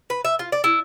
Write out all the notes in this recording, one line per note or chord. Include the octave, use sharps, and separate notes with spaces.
B4
E5
F4
D5
E4